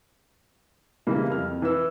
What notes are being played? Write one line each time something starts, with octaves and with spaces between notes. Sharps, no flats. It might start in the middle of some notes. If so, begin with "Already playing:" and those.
C#3 E3 G3 G#3 A#3
F2 F6
E3 B4 E6